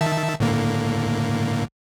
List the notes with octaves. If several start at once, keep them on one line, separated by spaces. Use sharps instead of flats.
D#3 E5 A5
A2 D3 A#3